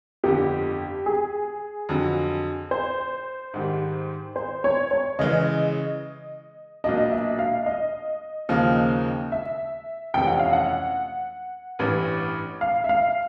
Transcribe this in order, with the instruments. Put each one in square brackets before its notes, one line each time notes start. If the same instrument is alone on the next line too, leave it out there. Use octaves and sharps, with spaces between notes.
[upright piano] G1 F2 D3 [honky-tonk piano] G4
[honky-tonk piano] G#4
[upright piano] F2 D3 F#3
[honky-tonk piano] C5
[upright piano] G#2 D#3 G3
[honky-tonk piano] C5
C#5
C#5
[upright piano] C#3 E3 G#3 [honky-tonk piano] D#5
[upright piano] B1 A#2 F#3 A#3 D4 [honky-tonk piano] D#5
[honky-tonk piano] E5
F5
D#5
[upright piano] D#2 C#3 F3 A#3 D#4
[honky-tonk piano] E5
[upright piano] F2 C3 E3 A3 C#4 [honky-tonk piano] G5
[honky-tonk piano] F#5
F5
F#5
[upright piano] A1 G2 E3
[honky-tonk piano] F5
E5
F5